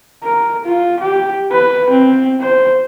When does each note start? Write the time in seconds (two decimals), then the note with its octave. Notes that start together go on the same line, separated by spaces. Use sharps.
0.23 A#4
0.65 F4
1.00 G4
1.51 B4
1.90 C4
2.41 C5